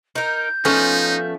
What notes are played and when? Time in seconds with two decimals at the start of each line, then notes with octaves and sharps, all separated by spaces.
0.15 D#4 A#4 G6
0.65 F3 A3 B3 C#4 D#4